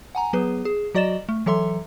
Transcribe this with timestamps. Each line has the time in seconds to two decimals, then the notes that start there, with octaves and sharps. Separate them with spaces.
0.15 F#5 G#5 A#5
0.33 F#3 B3 G#4 B4
0.65 G#4
0.95 F#3 F#4 D5 D#5 A6 E7
1.29 A3
1.46 E3 F#3 A4 E5 C6